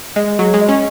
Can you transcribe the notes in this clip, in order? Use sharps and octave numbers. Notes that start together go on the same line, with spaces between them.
G#3 D#5
F#3 G#4
G#3
D#5
C#4